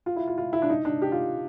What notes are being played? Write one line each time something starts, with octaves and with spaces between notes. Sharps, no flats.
F4
E4
F4
F4
E4
D4
D#4
D4
G4
F4